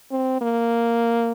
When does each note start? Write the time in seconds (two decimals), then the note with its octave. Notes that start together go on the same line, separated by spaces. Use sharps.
0.12 C4
0.41 A#3